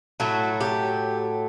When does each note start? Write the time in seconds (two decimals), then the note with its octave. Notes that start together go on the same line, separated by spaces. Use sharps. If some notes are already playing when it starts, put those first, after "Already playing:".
0.20 A2 F#3 A3 F#4
0.60 G4